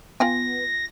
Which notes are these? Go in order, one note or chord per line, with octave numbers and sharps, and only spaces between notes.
B3 F4 G5 G#5 A#6